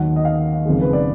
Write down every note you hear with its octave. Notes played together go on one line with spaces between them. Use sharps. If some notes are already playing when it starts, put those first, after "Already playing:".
Already playing: D#2 D#3 F#3 F#5
D#5
F5
F#1 F2 D#3 G#3
B4
D5